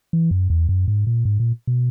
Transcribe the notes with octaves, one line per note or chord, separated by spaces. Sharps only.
E3
F#2
E2
F#2
G#2
A#2
G#2
A#2
B2